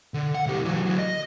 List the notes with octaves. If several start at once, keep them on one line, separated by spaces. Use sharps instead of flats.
D3
F#5
C#2 G4
E3 F#3
D2 F#3
D#5